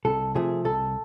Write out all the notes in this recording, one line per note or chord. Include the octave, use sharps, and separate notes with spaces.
C2 A4
C3 F3 A3 G#4
C2 A4